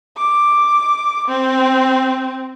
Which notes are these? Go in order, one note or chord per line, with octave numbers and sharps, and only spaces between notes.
D6
C4